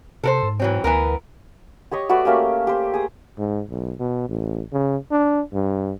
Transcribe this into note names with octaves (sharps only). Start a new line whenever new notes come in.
C3 A4 A#4 C5
G#2
E3 F#3 C4
D2 E3 B3 A#4
G4 C#5 D#5 C#6
A3 F#4 B4 D5
A3 A#3 C#4 G4
G4 C5
G#4 D#6
G#2
B1
B2
A1
C#3
D4
G2